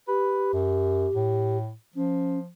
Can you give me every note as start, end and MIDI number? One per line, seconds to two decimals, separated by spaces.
0.08 1.57 67
0.08 0.52 71
0.53 1.08 42
1.15 1.73 45
1.96 2.50 53
1.96 2.39 61